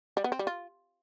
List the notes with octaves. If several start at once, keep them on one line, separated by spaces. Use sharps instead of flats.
G3
B3
C4
G3
F4